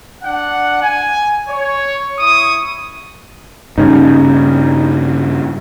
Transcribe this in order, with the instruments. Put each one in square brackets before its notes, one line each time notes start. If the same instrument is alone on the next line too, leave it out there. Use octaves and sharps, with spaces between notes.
[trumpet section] D4 F#5
G#5
C#5
E4 C#6 D#6
[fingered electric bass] G2 C#3 [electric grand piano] G3 C#4 D#4